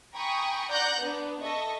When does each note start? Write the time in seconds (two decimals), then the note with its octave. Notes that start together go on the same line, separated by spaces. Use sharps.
0.15 G5 G#5 A#5 B5 C#6 D#6
0.71 D5 F#5 A#5 F#6 G6 A#6
1.00 B3 D4
1.39 A4 D#5 E5 C#6